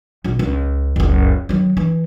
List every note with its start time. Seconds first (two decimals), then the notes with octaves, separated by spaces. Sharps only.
0.24 E1 A#1
0.39 C#2
0.96 F#1 C#2
1.49 D#3 F#3
1.77 E3